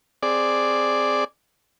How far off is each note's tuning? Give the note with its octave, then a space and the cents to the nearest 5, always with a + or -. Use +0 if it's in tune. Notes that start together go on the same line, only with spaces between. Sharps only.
C4 +0 G#4 +0 D5 +0